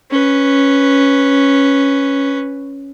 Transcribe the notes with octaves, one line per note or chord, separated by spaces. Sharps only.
C#4 B4